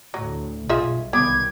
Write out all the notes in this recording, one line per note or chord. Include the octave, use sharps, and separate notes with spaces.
D2 A2 F#3
B1 G2 B2 F4 G#4 E5
C2 D#3 F#3 B3 D6 G#6